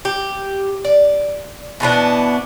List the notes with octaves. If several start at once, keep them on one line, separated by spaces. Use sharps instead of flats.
G4
D5
B2 E3 B3 D4